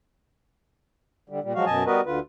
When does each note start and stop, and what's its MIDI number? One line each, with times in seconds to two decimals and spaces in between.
1.29 1.40 50
1.29 1.40 55
1.43 1.53 46
1.43 1.53 55
1.55 1.65 53
1.55 1.65 54
1.55 1.65 56
1.55 1.65 66
1.55 1.65 77
1.66 1.84 42
1.66 1.84 47
1.66 1.84 75
1.66 1.84 80
1.66 1.84 81
1.86 2.01 55
1.86 2.01 59
1.86 2.01 66
1.86 2.01 70
1.86 2.01 71
1.86 2.01 75
2.06 2.19 38
2.06 2.19 50
2.06 2.19 65
2.06 2.19 71